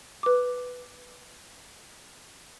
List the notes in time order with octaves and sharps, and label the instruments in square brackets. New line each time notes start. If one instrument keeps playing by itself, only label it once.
[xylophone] B4 D6